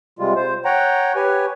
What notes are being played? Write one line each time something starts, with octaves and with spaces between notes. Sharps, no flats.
C3 G3 G#3 F4
C5
C#5 F#5 G5 A#5
G4 B4 C#5 G#5